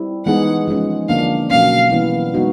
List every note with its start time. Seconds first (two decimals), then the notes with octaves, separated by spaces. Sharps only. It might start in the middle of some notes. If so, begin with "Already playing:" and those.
Already playing: G3 C4 E4
0.25 E3 G#3 B3 D#4 G#4 F#5
0.68 F3 G#3 C#4
1.08 D3 F3 A#3 D4 F5
1.50 B2 F#3 A#3 C#4 F5
1.92 E3 G3 B3 E4
2.34 G#3 B3 D#4 F#4